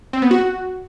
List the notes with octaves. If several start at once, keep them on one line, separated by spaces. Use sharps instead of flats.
C4
B3
F#4